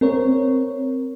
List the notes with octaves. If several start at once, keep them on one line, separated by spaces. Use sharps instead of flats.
C4 A#4 C#5